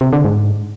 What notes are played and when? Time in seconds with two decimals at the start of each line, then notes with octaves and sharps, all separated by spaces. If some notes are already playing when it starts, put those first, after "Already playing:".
0.01 C3
0.13 D3
0.24 G#2